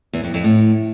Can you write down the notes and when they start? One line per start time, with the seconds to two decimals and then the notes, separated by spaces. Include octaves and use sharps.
0.13 E2
0.24 F2
0.34 F2
0.44 A2